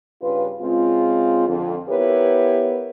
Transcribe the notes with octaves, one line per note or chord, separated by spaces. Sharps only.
G2 C#3 F4 B4
C#3 G#3 C4 F4
F2 D3
B3 E4 G4 A#4 B4 C#5